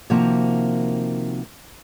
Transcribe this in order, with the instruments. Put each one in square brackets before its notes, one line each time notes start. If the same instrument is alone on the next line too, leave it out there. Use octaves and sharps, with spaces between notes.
[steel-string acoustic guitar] C3 D#3 F3 A#3 F#4